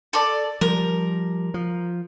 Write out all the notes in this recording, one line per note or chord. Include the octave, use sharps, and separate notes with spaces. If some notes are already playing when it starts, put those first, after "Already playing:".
A4 D5
F3 G3 A#4
F3